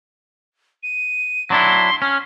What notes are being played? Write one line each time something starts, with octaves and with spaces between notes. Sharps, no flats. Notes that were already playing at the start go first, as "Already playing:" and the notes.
D#7
F#3 D4 E4 C6
C#4 F6